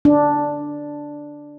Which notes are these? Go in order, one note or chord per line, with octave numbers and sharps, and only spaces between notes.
D4